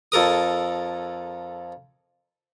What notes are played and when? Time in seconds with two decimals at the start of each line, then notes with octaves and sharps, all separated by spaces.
0.12 F2 A4 A#4 D#6